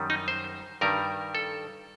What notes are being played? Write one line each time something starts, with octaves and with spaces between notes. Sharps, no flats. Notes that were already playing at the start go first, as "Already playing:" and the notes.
Already playing: F#2 D#3 G3
D#4
C5
G2 D#3 G3 A#4
A4